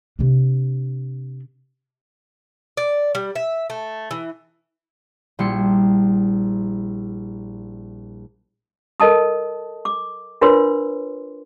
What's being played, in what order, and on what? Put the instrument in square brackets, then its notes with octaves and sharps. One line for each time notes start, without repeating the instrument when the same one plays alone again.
[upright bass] C3 D4
[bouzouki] D5
G3
E5
A3
E3
[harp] A#1 G3 E4 C6 C#7
[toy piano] A4 A#4 D#5 A5 D#6
D6
D4 F4 A#4 B4 C#5 C6